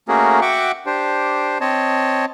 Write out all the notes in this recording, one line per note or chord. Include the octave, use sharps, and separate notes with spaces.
A3 A#3 C#4 F#4 G#4 A#4
F#4 E5 F#5 G5 C#6 D6
D4 G4 C5
C4 C#5 D#5 A5